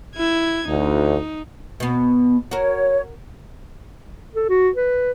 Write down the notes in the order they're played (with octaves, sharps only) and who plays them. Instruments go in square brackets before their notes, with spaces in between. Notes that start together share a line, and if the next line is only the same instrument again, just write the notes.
[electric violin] E4 G#6
[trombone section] D2 [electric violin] D#4
[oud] B2 B3
[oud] F#4 A#4 [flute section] C#5
[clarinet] A4
F#4
B4